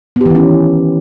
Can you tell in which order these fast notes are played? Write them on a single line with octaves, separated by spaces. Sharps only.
B3 G4 E3 D#3 C#4